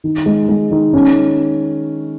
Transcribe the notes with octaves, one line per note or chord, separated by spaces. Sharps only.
D#3
G#3
G#3
D#3
C#4